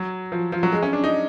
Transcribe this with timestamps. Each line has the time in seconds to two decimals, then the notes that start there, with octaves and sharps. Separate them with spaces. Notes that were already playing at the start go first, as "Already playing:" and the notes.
Already playing: F#3
0.32 F3
0.52 F3
0.63 F#3
0.72 G#3
0.83 C#4
0.93 D4
1.04 D#4